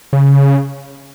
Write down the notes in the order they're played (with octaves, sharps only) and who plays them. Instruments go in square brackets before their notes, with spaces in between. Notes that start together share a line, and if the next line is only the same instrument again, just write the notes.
[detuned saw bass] C#3